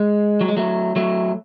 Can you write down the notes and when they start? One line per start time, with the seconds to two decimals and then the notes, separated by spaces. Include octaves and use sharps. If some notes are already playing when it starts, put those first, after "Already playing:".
Already playing: G#3
0.41 F#3
0.48 G#3
0.57 F#3 A3
0.96 F#3 A3